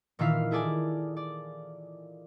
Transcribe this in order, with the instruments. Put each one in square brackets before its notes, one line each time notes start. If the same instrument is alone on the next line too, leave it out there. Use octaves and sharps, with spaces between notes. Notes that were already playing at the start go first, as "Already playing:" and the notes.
[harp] A#2 D#3 E3 F4 E5 F5
E4 G#4 A4 D5 G#5
D5